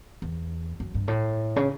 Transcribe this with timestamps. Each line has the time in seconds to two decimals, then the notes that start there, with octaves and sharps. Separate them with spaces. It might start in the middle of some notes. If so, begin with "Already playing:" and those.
0.22 E2
0.80 F#2
0.94 G2
1.08 A2
1.56 C#3